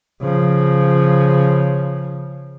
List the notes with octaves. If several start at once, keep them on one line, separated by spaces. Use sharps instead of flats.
C#3 F3